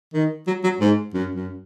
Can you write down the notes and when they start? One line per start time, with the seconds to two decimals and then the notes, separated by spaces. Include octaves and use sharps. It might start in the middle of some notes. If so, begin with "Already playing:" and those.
0.14 D#3
0.47 F#3
0.64 F#3
0.80 G#2
1.14 F#2
1.35 F#2